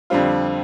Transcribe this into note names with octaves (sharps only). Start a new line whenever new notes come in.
F2 D3 G3 C4 F4